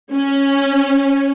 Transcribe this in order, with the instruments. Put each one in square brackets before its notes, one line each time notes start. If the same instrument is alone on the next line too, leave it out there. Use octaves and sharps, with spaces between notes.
[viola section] C#4